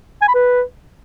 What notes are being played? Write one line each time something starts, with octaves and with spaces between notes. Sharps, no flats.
G#5
B5
B4